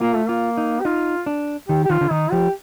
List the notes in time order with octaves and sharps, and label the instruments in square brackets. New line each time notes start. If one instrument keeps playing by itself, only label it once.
[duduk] A#3 [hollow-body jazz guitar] F4
[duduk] A3
[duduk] A#3 [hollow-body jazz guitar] F4
[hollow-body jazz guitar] D#4
[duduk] G4
[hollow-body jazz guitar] D#4 [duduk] F4
[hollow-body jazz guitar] D4
[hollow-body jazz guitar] D#3 [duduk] G4
[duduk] G4
[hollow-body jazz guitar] D#3 [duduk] F4
[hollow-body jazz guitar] D3
[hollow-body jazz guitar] D#3 [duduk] D#4
[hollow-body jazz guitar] F3 [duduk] G4